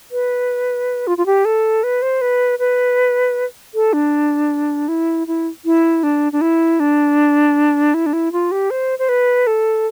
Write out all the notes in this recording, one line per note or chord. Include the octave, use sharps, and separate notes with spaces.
B4
F4
F4
G4
A4
B4
C5
B4
B4
A4
D4
E4
E4
E4
D4
D4
E4
D4
E4
D4
E4
F4
G4
C5
C5
B4
A4